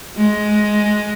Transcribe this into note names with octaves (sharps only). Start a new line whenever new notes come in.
G#3